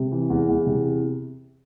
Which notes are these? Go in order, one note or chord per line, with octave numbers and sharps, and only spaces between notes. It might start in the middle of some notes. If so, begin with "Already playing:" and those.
Already playing: C3
E3
E2
E2
C3